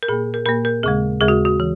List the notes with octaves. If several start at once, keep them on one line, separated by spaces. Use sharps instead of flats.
A#4
A#2 A#3 G#4
A#4
A#2 A#3 A#4
A#4
D#2 C#3 G#3 G#4
D#2 C#3 G#3 G#4
F#4
F#4
E3